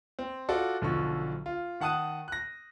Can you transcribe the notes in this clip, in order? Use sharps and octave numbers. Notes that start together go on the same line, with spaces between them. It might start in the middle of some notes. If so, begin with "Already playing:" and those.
C4
F4 F#4 A4 D5
B1 D3 F3 C#6
F4
D#3 F#5 A5 D#6 F#6 D#7
F#6 A#6